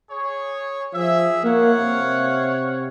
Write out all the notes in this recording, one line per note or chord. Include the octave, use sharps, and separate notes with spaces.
G#4 C#5
F3 G#4 E5
A#3 C#5 F5 F#5
C3